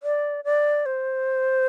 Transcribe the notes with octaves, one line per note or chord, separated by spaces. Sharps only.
D5
D5
C5